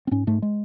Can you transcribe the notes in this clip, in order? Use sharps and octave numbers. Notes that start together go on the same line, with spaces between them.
C4
G#2 C#4
G#2 A3
G#3